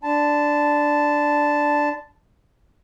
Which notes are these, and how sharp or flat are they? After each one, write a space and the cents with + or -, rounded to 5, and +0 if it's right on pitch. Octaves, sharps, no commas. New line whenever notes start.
D4 +0 A5 +0 C6 -45